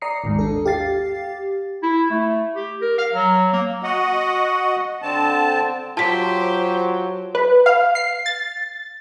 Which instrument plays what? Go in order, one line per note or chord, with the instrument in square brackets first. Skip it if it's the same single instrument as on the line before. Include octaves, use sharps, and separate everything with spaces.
[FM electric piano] D5 A#5 D#6 C7 C#7
A1 D#2 G#2
D4 A4
G4 F5 A6 C7
[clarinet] E4
A3
G4
A#4
F5
F#3
A#3
[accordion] F#4 D#5 F#5
D3 C4 A5
[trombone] F#3 [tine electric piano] F4 [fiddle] G4 C5 [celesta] A5 B6
[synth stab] B4
F5
C7
A6